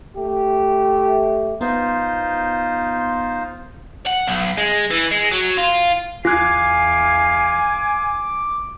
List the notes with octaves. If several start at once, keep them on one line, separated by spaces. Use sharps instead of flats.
A3 G4
B3 D#4 F4 C5
F#5
B1
G#3
E3
G#3
F#3
F4
E2 F4 F5 G#5 D6 F#6